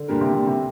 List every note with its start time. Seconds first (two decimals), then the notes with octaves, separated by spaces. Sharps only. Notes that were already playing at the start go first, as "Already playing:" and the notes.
Already playing: D3
0.08 A#2 G3 D4 G4 A#4
0.21 C3
0.34 C3
0.47 C3